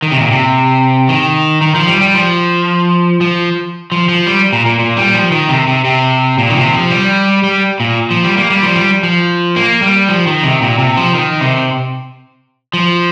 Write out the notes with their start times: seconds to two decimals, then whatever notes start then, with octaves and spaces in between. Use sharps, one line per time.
0.02 D#3
0.12 C3
0.21 A#2
0.31 C3
1.09 D#3
1.61 D#3
1.75 F3
1.88 G3
2.01 G3
2.14 F3
3.21 F3
3.92 F3
4.09 F3
4.26 G3
4.53 A#2
4.66 A#2
4.79 A#2
4.97 G3
5.14 F3
5.32 D#3
5.49 C3
5.68 C3
5.85 C3
6.38 A#2
6.50 D#3
6.56 C3
6.73 F3
6.90 G3
7.43 G3
7.80 A#2
8.11 F3
8.24 G3
8.37 A#3
8.50 G3
8.63 F3
8.76 G3
9.03 F3
9.56 A#3
9.82 G3
10.09 F3
10.27 D#3
10.43 C3
10.62 A#2
10.78 C3
10.97 F3
11.14 D#3
11.41 C3
12.74 F3